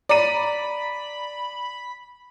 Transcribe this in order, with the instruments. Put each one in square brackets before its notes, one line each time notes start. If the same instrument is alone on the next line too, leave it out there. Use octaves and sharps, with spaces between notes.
[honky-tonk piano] D5 A#5 D#7 [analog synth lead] B5